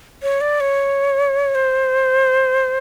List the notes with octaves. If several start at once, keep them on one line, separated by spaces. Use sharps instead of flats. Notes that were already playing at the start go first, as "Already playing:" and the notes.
C#5
D5
C#5
C5